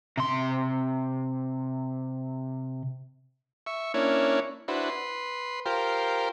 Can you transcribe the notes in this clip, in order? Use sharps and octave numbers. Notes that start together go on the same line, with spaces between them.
C3 C6
E5 C#6
A#3 C#4 D4 E4 C#5
D4 E4 F#4 B4 C5
B4 C6
F4 G4 A#4 C5